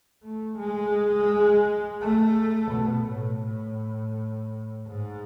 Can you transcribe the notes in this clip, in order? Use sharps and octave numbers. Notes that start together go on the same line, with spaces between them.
A3
G#3
A3
B2
A2
A2
G#2